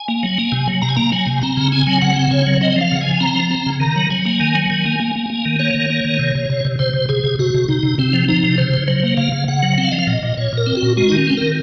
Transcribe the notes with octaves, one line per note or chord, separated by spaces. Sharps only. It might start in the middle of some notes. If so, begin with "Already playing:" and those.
Already playing: G#5
A#3
F#3
A#3
C3
F#3
C3 A#5
G#5
A#3 A#5
F#3 G#5
C3
C4 A#5
C#3
C4 G#5
F#3
C#3 F#5
C4
C#3 C#5
F#3
C4 D#5
F3 F5
C#3 F#5
G#5
F3
C4 A#5
F3
C4
C#3
D#3 A#5
F#3
F#3 G#5
A#3
D#3
F#3
D#3
A#3
A#3
A#3
A#3
D#3
A#3 C#5
D#3
A#3
D#3
C3
C3
C3
C3
C3 C5
C3
C3 G#4
C3
C3 F#4
C3
C3 D#4
C3
C3 C4
F3
F3 D#4
C3
C#3 C5
C#3
F#3 C5
A#3
C#3 F5
C#3
C#3 F#5
F#3
C4 F#5
F5
F3 D#5
F5
A#2 D#5
A#2
A#2 C#5
A#2 A#4
C4
F#4
A#2
G#3 F#4
D#3 D#4
C#4
C4
D#3 A#4